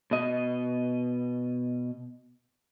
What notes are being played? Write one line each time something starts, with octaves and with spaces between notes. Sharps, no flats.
B2 D#5